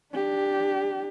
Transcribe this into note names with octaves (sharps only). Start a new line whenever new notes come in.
D4 G4